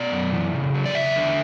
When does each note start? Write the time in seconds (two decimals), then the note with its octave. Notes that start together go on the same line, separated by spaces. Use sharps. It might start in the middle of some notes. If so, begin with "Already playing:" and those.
Already playing: B2 D5
0.12 F#2
0.33 E3
0.54 C#3
0.75 F#3
0.86 D5
0.95 E2 E5
1.16 D3